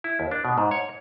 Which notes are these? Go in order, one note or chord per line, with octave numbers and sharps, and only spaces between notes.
E4
D#2
D4
B2
G#2
C#5